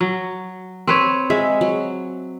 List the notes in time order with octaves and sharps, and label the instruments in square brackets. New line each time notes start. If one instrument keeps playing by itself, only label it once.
[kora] F#3
C4 B4 C#5
[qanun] G#3 [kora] E5
[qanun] F#3